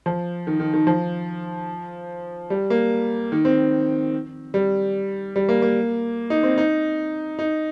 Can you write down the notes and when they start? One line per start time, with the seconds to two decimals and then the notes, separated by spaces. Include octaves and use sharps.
0.06 F3
0.47 D#3
0.60 D#3
0.74 D#3
0.87 F3
2.50 G3
2.70 A#3
3.32 D#3
3.45 C4
4.54 G3
5.36 G3
5.49 A#3
5.62 A#3
6.30 D#4
6.43 C4
6.58 D#4
7.39 D#4